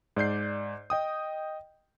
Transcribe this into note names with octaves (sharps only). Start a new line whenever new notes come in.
G#2 D5 G6 C7
D#5 G5 D#6